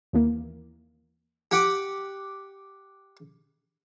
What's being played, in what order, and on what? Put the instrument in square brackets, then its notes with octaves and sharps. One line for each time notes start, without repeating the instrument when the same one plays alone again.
[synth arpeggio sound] D#2 E3 A#3
[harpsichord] G4 F#5 D6